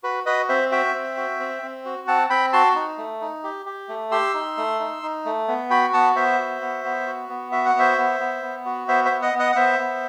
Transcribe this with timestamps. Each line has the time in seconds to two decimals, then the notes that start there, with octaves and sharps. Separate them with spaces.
0.03 F#4 B4
0.26 F#4 B4 D#5
0.48 C4 C5 E5
0.71 F#4 E5 G5
0.94 C4
1.17 F#4
1.40 C4
1.62 C4
1.85 F#4
2.07 C4 F#5 A5
2.30 C4 G5 B5
2.53 F#4 A5 C6
2.75 D#4
2.98 A3
3.21 D#4
3.44 G4
3.66 G4
3.89 A3
4.11 G4 C6 E6
4.34 D#4
4.57 A3
4.80 D#4
5.03 D#4
5.25 A3
5.48 B3
5.70 F#4 G5 B5
5.93 B3 F#5 A5
6.16 B3 C5 E5
6.39 F#4
6.61 B3
6.85 B3
7.06 F#4
7.29 B3
7.52 F#4 E5
7.66 F#5
7.75 B3 C5 E5
7.98 B3
8.20 B3
8.43 B3
8.65 F#4
8.88 B3 C5 E5
9.05 C5 E5
9.11 B3
9.22 D#5 F#5
9.33 B3
9.39 D#5 F#5
9.52 F#5
9.56 B3 C5 E5
9.79 B3